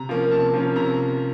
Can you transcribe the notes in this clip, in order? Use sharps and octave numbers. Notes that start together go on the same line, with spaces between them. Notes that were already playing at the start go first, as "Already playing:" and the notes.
Already playing: C3 A#5
F3 A#3 C#4
C3 A5
F3 A#3 C#4
C3 A#5